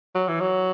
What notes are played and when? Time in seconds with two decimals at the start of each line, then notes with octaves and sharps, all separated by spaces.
0.15 F#3
0.28 E3
0.41 F#3